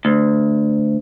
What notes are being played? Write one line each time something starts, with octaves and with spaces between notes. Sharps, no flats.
D2